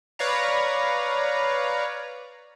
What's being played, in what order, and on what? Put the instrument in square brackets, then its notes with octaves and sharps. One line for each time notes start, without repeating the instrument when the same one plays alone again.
[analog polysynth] B4 C#5 D5 F5 A#5